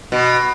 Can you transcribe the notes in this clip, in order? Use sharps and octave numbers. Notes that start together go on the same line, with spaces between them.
B2